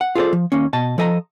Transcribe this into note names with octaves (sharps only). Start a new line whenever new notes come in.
F#5
F4 G#4 A4 B4 C5 D5
F3
D#2 A#3 C#4
B2 D#5 A5
F3 A4 D#5 G#5 A#5